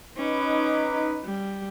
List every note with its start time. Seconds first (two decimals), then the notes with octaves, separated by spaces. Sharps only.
0.17 C#4 D#4 B4 D6
1.24 G3